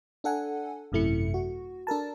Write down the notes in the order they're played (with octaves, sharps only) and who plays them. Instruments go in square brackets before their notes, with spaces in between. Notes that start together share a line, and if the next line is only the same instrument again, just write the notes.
[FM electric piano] D4 A4 F#5 G#5
G#1 F#2 C3 A3 E4 C#7
F#4
D4 A4 A#4 A5